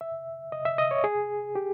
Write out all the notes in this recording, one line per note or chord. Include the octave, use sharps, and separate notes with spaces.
E5
D#5
E5
D#5
C#5
G#4
G4